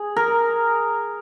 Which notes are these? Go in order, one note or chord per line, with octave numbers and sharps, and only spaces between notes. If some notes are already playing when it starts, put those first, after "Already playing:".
Already playing: G#4
A#4